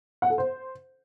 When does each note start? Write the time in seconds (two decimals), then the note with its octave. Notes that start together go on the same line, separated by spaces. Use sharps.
0.22 F#5
0.30 A4
0.38 C5